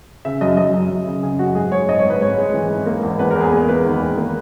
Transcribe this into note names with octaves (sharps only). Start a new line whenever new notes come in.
C#3 E5
F#2 D#5
F#2 D#5
F#2
F#2
C#3
C#3 G#4
F#2 F#4
G#2 G#4
G#3 C#5
G#2 D#5
C#5
G#2
B4
G#2 C#5
G#3
E3
G#2
A#3
E2
E2 B4
A#4
E2
G#4
A#3 G#4
A#3 B4
D#3
E2
A#3